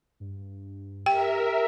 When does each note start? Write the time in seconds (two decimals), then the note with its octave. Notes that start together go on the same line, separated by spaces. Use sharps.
0.20 G2
1.06 G4 A#4 E5 G5